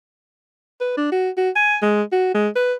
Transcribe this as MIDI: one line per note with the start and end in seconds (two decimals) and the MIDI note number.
0.81 0.94 71
0.97 1.11 62
1.12 1.30 66
1.37 1.50 66
1.56 1.77 80
1.82 2.03 56
2.12 2.34 66
2.34 2.49 56
2.56 2.73 71